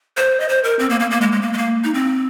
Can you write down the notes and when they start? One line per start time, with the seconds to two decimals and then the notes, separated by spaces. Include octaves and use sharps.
0.17 C5
0.40 D#5
0.49 C5
0.64 A#4
0.79 C4
0.90 A#3
1.00 A#3
1.11 A#3
1.21 G#3
1.32 G#3
1.42 A#3
1.53 G#3
1.58 A#3
1.84 D#4
1.94 C4